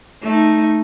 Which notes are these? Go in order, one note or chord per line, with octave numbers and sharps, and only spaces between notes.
A3 D#4